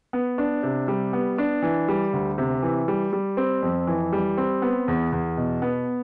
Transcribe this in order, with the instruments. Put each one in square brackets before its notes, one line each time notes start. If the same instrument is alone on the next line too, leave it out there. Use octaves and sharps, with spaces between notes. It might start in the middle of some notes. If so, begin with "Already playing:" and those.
[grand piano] B3
D4
C3
G3
B3
D4
E3
G3
D2
C3
E3
G3
G3
C4
F2
E3
G3
C4
B3
E2
E2
B2
B3